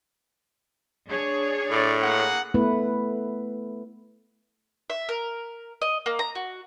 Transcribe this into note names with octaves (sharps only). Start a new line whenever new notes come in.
D4 G#4 C#5
A2 D5
A#3 G#4 F#5
A3 B3 E4 B4
E5
A#4
D#5
A#3
A#5
F#4